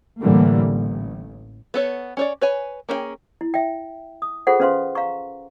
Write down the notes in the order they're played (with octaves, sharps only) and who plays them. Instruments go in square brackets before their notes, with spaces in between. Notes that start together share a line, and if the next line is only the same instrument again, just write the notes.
[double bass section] A2 D3 E3 G3 A#3
A1
[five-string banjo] B3 A4 C#5
C#4 C#5 D5
B4 C#5 G#5
A#3 C#4 D4 G#4 G5
[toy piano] E4
E5 G5
D#6
F4 G#4 A4 C5 F#5
C#4 B4 C5 F5 C6
F5 A#5 C#6